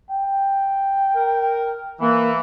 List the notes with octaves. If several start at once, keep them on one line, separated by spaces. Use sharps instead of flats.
G5
A#4
E3 A#3